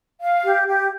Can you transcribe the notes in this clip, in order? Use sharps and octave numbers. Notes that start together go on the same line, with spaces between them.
F5
G4
G4